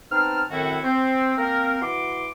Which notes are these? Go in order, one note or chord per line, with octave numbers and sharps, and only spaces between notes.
B3 C4 D#4 A5 F6
F#2 A2 D#3 C4 E4 F#4
C4
A#3 C4 A#4
E3 F#4 C6 D6